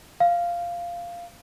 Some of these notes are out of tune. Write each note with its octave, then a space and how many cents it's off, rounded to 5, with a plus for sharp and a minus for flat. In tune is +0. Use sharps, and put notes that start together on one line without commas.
F5 -10